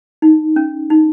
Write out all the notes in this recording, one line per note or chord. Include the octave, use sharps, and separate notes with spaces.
D#4
C#4
D#4